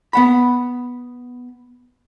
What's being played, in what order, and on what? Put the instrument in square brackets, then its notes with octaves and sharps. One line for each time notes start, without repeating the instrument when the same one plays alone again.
[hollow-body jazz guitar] B3 F#5 B5